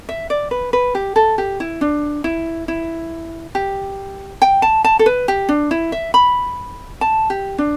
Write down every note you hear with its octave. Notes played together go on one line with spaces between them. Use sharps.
E5
D5
B4
B4
G4
A4
G4
E4
D4
E4
E4
G4
G5
A5
A5
A4
B4
G4
D4
E4
E5
B5
A5
G4
D4